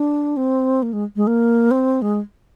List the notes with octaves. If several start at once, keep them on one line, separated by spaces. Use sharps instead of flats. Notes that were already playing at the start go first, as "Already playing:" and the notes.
Already playing: D4
C4
A#3
G#3
G#3
A#3
C4
G#3